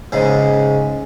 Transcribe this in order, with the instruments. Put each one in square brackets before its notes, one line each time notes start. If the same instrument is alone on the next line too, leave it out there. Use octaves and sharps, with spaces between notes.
[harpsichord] G#2 C#3 G#3